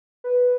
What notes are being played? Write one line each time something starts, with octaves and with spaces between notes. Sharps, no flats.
B4